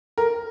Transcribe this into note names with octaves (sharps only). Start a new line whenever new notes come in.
A#4